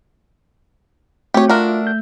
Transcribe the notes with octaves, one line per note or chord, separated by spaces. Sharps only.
A3 C4 F#4 G4 C#5
D4 F4 F#4 A#4 E5
G6